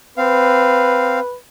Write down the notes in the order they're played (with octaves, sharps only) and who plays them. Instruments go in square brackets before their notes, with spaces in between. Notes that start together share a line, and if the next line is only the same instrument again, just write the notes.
[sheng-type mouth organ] C4 F5 [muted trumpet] B4